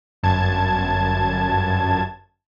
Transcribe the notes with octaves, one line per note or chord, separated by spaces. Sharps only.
G1 F#2 A5 G#6